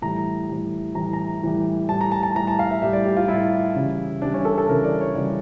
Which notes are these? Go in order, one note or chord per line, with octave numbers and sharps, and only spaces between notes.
A2 E3 G3 A#5
A2 E3 G3
A2 E3 G3 A#5
A#5
A2 E3 G3
A2 G3 A5
A#5
A5
A5
A2 G3 A#5
A5
F5
E5
A2 G3 E5
D5
G4
F4
A2 G3 E4
C#3 E3 G3
C#3 E3 G3 D4
C#4
A4
A4
C#3 E3 G3 A#4
D5
C#5
C#3 E3 G3 D5